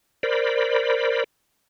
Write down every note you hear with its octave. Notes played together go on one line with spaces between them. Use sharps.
A#4 C5 D5 B5